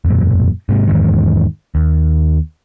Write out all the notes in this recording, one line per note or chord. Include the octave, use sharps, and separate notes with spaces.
E1 F#2 A#2
G#2 C3
E2 G#2 D#3
D#2